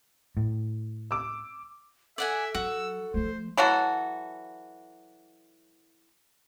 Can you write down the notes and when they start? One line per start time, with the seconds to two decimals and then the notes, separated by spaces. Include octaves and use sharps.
0.37 A2
1.11 D6 E6
2.18 A4 D5 E5 F#5 G#5
2.55 F#3 F#4 E6
3.14 F3 A3 C5
3.57 E3 F#3 F#4 A4